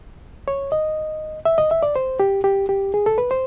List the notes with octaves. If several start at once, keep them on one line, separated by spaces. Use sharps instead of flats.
C#5
D#5
E5
D#5
E5
D5
C5
G4
G4
G4
G#4
A4
B4
C5